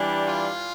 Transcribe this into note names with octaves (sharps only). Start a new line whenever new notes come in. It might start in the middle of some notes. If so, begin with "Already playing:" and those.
Already playing: E3 G3 D4
F4